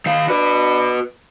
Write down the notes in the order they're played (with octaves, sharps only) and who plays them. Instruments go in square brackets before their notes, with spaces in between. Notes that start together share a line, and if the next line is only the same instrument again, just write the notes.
[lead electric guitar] D#3 F5
[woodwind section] D4 B5 D6 [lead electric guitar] F#4 B4